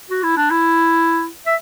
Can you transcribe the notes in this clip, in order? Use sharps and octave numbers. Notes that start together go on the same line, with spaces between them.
F#4
E4
D4
E4
E5